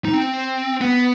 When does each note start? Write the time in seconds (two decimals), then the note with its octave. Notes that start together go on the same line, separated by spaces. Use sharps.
0.05 D#4
0.13 C4
0.81 B3